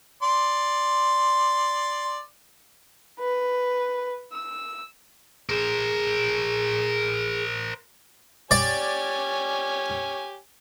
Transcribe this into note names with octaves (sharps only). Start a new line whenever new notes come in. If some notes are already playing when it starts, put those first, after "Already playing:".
D5 C6
B4
E6
G#4 A#4 C5
G4 C#5 D5 G#5